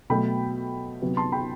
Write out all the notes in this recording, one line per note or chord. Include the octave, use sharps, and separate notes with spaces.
B2 F#3 A3 G5 B5
C3 F#3 B3
A5 C6
G5 B5